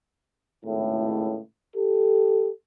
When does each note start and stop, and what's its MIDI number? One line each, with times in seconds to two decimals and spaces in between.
0.65 1.38 32
0.65 1.38 37
0.65 1.38 45
1.75 2.49 67
1.75 2.49 69